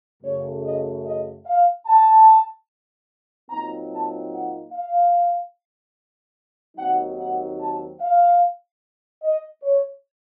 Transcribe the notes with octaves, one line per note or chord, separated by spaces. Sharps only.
F#2 C#3 A3 C#5
D#5
D#5
F5
A5
A#2 F#3 C4 D#4 A#5
A5
F#5
F5
D#2 D#3 F#3 C4 D#4 F#5
F#5
A5
F5
D#5
C#5